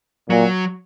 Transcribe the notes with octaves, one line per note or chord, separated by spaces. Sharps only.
A#2 F#3